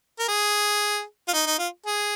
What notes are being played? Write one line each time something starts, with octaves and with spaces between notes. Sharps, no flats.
A#4
G#4
F4
D#4
D#4
F4
G#4